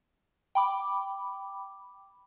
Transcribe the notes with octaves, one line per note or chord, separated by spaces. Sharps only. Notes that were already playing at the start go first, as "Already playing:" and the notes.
G5 B5 D6